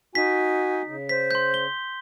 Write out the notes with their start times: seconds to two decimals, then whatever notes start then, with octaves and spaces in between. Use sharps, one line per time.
0.15 D#4 F#4 G#5 B6
0.87 C#3
1.09 C5 B6
1.31 C6 G6
1.54 G7